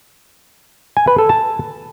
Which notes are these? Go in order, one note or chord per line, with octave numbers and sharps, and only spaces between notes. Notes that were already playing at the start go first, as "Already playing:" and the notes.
G#5
B4
A4
A5